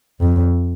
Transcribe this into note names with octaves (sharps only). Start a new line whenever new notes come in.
F2